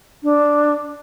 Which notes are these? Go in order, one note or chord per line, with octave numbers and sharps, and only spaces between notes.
D4